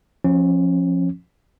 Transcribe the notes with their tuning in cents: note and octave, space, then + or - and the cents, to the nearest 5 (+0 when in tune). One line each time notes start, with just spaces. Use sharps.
F3 +0 C#4 -30